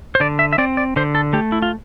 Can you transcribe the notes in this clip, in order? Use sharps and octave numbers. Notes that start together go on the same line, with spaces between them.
C5
D3 D5
E5
E5
C4 D5
D5
D3 C5
A4
A3 G4
E4
F4